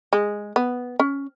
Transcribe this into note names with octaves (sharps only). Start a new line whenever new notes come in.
G#3
B3
C#4